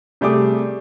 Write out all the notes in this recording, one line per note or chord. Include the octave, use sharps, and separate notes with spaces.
C3 G3 A3 G#4 D6